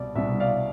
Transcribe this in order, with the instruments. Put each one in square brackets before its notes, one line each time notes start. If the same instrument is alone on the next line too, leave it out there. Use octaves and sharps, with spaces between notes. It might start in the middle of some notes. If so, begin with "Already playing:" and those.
Already playing: [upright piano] C2 B2 G3 D5
C2 B2 G3 E5
D5 F5